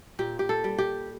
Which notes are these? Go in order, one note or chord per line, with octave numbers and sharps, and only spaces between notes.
A#2 G4
G4
A4
G3
G4